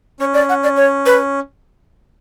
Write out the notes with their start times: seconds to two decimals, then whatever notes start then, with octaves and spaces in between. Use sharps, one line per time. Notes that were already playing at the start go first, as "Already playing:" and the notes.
0.20 C#4 C#5
0.34 D5
0.49 F#5
0.64 D5
0.77 C#5
1.06 B4